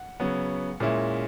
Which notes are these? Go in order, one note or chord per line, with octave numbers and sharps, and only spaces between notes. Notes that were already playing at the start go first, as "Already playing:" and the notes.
Already playing: F#5
C#3 F#3 B3
A#2 G#3 C#4 E4